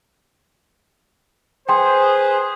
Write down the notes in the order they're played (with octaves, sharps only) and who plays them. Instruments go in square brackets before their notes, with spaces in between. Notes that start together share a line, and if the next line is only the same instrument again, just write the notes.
[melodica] G#4 [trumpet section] B4 C5 [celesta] G5 C6